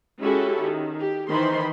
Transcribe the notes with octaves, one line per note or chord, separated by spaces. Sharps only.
G#3 C#4 E4 F#4 G4 A4
D#3
G4
D#3 E3 C5 B5 C6